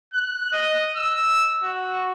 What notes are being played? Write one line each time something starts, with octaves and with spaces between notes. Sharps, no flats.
F#6
D#5
E6
F#4